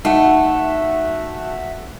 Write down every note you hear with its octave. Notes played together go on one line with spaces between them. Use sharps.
A3 D#4 F#4 E5 F#5